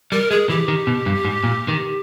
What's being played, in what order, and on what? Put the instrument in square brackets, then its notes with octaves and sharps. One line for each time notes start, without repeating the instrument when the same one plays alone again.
[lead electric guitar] G3 [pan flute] A#4
[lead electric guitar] G#3 [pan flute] G#4
[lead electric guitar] E3 [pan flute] G4
[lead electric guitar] D#3
B2
G2
G#2
A#2
D#3